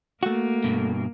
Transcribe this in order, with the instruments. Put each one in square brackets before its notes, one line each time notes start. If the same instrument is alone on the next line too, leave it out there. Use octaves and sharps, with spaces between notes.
[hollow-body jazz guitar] A3 F#4 [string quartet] A#3
[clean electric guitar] G2 B2